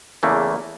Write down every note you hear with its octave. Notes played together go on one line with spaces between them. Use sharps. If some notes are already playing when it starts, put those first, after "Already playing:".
E2 C#3 E3 A3 A#3